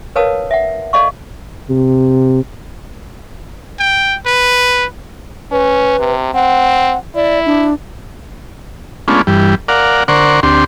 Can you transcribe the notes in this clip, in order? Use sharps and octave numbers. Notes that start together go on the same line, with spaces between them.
A#4 B4 C#5 F5 A5 D#6
E5 F#5
A4 D5 D#5 F5 C#6
C3
G5
B4
C#4 B4
C3
C4 F#5
E4 D5
D4
G#3 A3 B3 C#4 D4 F4
G2 E3 G3
A#4 D5 F5 F#5
D3 A#4 C5 D5 F#5 C#6
D2 C4 D4 G4 C6